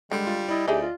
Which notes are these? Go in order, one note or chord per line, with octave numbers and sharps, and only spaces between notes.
D3 G3 G#3
F4
E4 D5 D#5
D2 D#4 E4 G4 G#4
F4